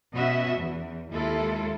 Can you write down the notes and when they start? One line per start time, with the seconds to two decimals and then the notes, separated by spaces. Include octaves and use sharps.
0.14 B2 B3 C#4 F#4 D#5 E5
0.58 E2
1.11 D#2 G#3 E4 F4 A4